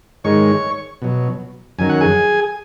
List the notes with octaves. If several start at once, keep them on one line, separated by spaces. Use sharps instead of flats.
G#2 D#3 G#3 C#5 C#6
B2 F#3
F#2 D#3 F#3 G#5
F#5
G#4 G#5